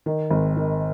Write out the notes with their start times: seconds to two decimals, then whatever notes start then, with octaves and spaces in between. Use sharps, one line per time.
0.06 D#3
0.31 G#1
0.57 D#3